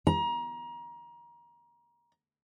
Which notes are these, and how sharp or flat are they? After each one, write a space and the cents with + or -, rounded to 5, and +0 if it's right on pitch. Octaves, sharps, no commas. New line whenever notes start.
A#5 +30